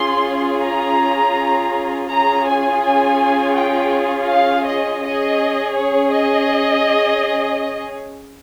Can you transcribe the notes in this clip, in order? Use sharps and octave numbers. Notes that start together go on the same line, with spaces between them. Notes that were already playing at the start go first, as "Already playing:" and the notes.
Already playing: C#4 F4 G#4 C6
A#5
C#4 F4 G#4 A#5
G#5
G#5
G5
F5
D#5
C#4 G#4 D#5
C#5
D#5